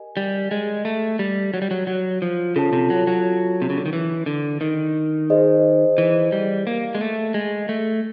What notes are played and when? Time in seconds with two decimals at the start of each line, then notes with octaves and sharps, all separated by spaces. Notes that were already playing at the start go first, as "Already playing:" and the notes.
Already playing: G4 A#4 D#5 G#5
0.17 G3
0.51 G#3
0.85 A3
1.19 G3
1.54 F#3
1.62 G3
1.71 F#3
1.87 F#3
2.22 F3
2.56 C#3 F4 A4 C#5 F5 A5
2.73 C3
2.90 F#3
3.07 F#3
3.62 C3
3.70 C#3
3.77 D3
3.86 D#3
3.93 E3
4.26 D3
4.61 D#3
5.30 G#4 C5 D#5
5.98 E3
6.32 G3
6.67 A#3
6.95 G#3
7.01 A3
7.34 G#3
7.69 A3